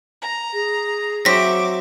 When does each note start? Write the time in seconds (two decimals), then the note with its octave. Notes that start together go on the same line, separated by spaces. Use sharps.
0.22 A#5
0.54 G#4
1.25 F#3 C4 F#4 E5 D6 A#6 B6